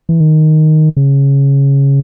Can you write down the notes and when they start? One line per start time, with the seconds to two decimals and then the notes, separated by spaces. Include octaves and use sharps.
0.09 E3
0.20 D#3
0.97 C#3